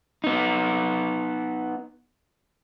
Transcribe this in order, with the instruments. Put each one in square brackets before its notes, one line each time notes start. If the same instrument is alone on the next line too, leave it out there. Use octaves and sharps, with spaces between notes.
[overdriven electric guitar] B3 D#4